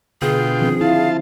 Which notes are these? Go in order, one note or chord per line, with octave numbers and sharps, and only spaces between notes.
B2 D3 F4 G#4 G5
D#3 F3 C4
E4 F4 F5 A5